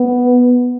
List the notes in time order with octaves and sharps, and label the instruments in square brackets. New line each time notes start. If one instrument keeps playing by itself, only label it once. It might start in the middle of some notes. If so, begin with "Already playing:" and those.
Already playing: [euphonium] B3